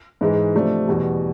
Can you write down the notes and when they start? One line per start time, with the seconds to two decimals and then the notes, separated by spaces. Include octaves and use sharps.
0.21 G#2 E3 G#3
0.54 C3 F3 A3 D4
0.87 E2 B2 G3